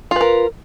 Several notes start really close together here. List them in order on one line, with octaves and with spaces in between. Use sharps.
F4 B4 A#4